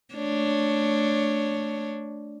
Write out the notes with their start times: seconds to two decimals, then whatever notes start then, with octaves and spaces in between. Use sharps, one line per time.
0.15 A3 D4 C#5